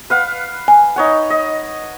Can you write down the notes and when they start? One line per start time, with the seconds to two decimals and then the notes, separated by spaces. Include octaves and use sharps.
0.10 B4 F5 F#5
0.68 G#5
0.96 D#4 C#5 F#5
1.30 D#5